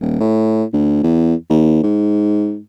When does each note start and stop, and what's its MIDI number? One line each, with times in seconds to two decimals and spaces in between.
0.01 0.16 27
0.21 0.64 45
0.74 0.99 38
1.03 1.35 40
1.50 1.82 39
1.83 2.59 44